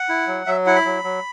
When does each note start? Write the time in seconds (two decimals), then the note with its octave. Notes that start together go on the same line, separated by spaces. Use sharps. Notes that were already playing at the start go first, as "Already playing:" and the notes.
Already playing: F#5
0.09 E4
0.27 F#3
0.46 F#3 E5
0.66 E4 F#5
0.76 B5
0.85 F#3
1.04 F#3